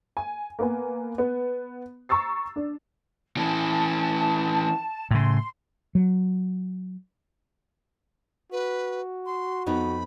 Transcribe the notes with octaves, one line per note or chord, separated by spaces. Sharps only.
G#5
A#3 B3 G#5
B3
A#5 C#6 E6 A6 C7
D4
E3 C#4 A5
A2 C#3 C6
F#3
F#4 B4
C6
F2 B3 D#4 B5